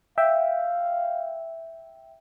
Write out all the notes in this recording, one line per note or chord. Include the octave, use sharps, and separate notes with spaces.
E5 F5 G5